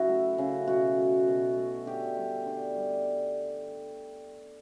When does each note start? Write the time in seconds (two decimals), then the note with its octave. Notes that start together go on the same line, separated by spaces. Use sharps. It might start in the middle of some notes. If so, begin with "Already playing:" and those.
Already playing: C#3 F#3 E4 F#4
0.08 A3
0.38 C#3
0.67 B2 F#4
0.97 A3
1.28 B2
1.57 A3
1.86 D3 G4
2.17 G3
2.46 D3
2.76 G3